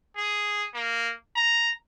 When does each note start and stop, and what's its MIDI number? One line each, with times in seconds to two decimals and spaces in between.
0.17 0.67 68
0.74 1.12 58
1.36 1.71 82